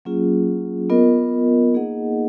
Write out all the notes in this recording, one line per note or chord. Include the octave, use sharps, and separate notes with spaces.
F#3 A#3 C#4 F4 G#4
B3 F4 A#4 D#5
A#3 D#4 G#4 D#5 F#5